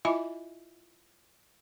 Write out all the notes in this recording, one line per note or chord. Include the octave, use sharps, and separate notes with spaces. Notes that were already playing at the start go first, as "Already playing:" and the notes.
E4 F4 D#5 E5 G#5 B5